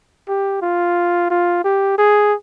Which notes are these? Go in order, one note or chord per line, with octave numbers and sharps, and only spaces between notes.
G4
F4
F4
G4
G#4